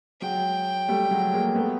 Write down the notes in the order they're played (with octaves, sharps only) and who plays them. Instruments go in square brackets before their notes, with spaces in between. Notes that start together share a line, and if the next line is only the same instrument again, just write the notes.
[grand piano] F#3 G#3 [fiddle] G5
[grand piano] G3 A3
F#3 G#3
G#3 A#3
A3 B3